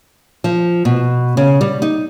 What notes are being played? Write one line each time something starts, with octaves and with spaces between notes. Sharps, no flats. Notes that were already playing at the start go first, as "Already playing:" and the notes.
F3
B2
C#3
G3
D#4